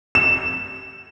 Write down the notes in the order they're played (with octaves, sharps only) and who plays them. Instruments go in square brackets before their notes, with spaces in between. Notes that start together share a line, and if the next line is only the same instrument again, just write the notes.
[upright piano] E7